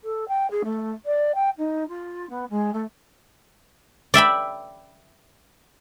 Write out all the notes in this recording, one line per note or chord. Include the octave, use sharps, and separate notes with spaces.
A4
G5
G#4
A3
D5
G5
D#4
F4
B3
G#3
A3
D5 E5 G5 B5